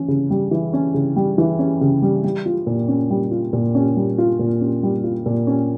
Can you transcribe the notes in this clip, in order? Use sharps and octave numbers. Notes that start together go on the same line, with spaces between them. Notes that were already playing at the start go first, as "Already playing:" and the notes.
Already playing: E3 C#4
C#3
G3
E3
C#4
C#3
G3
E3
C#4
C#3
G3
G3
F4
A#2
C#4
G3
F4
A#2
C#4
G3
F4
A#2
C#4
G3
F4
A#2
C#4